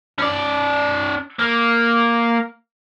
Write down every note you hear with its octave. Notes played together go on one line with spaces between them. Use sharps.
C#4 D5
A#3